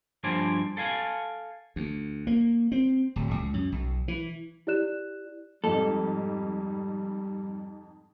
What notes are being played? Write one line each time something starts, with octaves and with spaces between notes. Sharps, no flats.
G2 F3 D4 C5 D5 G#5
A4 F5 G#5
D2
A#3
C4
D1
C#2
F#2
B1
E3
E4 G4 D5 F#6 E7
F2 G#2 C3 G3 A4